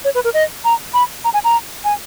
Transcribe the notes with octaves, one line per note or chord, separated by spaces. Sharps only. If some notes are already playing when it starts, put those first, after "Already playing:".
C#5
B4
A#4
D#5
A#5
B5
A#5
G#5
A#5
G#5